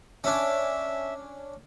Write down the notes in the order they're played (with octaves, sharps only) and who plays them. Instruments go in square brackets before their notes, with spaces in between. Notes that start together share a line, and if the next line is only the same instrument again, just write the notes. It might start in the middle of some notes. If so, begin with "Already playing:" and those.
[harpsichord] C#4 D4 [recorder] E5